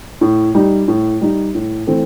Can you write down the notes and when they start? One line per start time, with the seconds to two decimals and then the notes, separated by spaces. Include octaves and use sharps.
0.21 A2
0.55 G3 D#4
0.88 A2
1.21 G3 D#4
1.55 A2
1.87 E3 A3 C4